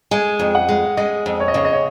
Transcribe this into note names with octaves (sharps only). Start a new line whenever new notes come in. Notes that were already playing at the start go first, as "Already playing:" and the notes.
G#3 G#5
F2
F#5
G#3
G#3 D#5
F2
C#5
D#5
C#3 C#5
D#5
C#5